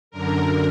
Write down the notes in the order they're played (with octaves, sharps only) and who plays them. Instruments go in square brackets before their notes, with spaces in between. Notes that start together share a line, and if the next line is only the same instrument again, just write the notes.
[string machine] F#2 D3 A#4